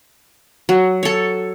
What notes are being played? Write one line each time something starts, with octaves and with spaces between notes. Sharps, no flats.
F#3
A4 C#5